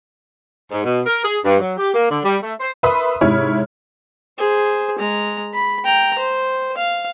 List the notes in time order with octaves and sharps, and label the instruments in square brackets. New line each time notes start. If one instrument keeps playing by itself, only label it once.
[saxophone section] G#2
B2
A#4
G#4
G2
F#3
G4
A#3
D3
G3
A3
C5
[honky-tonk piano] A#4 B4 E5 B5 C6 D#6
G#2 C3 E4 C#5 B5 F6
[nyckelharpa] G#4 C5
G#3 A#5
B5
G5 A#5
C5
F5